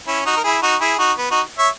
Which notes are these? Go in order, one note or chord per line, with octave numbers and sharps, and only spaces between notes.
C#4 E4
D#4 F#4
A#4
E4 G#4
D#4 F#4
E4 G#4
D#4 F#4
B3
D#4 F#4
C#5 E5